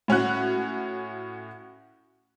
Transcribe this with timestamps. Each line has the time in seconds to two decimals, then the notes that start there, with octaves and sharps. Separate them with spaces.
0.08 A2 C#4 F#4 F#6